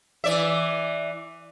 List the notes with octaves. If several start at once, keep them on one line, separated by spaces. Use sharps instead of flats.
E3 D5 E5